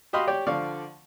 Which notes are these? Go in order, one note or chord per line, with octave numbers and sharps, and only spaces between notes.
F#4 G4 D#5 F5 B5 C6
G4 C#5 D5 G5
D3 F3 D5 F5 C#6